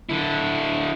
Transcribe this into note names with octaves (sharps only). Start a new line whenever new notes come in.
D3 E4